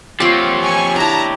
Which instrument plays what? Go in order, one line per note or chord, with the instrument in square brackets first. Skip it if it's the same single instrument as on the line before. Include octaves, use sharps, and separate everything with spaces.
[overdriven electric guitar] F3 C4 [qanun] F4 F#5 [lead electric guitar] G4 C#5
[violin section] G#5 C#6
[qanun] D4 E4 [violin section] A5 A#5